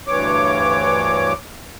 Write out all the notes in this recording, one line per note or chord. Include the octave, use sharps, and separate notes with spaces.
D2 G2 E3 C#5 D6